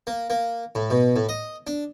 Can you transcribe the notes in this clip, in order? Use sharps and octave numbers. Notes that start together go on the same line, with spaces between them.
A#3
A#3
A2
B2
A2
D#5
D4